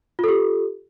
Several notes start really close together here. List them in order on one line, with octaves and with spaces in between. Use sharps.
F4 A4 G4